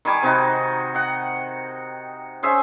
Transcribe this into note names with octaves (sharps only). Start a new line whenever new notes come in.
D#3 G3 G#5 D6
C3 D#4 F#4
D#5 F#5
C#4 G#4 C5 E5